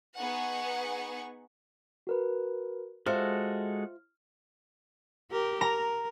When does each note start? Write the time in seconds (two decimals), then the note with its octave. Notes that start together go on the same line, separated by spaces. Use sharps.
0.16 B3 D#4 G#4 B4 F#5 C#6
2.07 F#4 A#4 B4
3.06 G#3 F4 F#4 A4 C5 E5 F6
5.31 G4 A#4
5.61 A#4 A#5